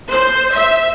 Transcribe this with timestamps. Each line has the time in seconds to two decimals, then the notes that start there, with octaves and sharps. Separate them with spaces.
0.11 C5
0.52 E5